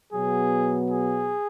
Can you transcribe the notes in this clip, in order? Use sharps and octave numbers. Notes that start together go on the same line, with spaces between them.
B2 F#3 B3 G#4
G#4